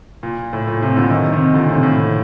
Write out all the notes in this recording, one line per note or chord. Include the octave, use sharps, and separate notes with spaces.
A#2
A2
A#2
A2 C3
A#2 D3
C3 D#3
C3 D#3
A#2 D3
A2 C3
A2